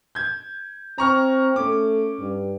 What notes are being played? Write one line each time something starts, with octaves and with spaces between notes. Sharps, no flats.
G6 G#6
C4 A#5 C#6 F6
A3 C#4 D6
G2